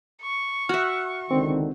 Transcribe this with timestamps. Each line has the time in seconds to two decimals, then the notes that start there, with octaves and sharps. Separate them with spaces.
0.22 C#6
0.69 F#4 E5 F6 F#6
1.31 C#2 D3 D#3 C4